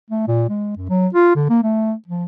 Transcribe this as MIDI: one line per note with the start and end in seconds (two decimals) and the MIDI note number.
0.10 0.23 57
0.27 0.48 46
0.49 0.71 56
0.76 0.85 42
0.89 1.07 54
1.14 1.31 65
1.35 1.47 50
1.50 1.59 58
1.63 1.93 57
2.07 2.25 53